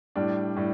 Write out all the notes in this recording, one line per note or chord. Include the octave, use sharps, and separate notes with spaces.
A2 G3 D4
A2 G3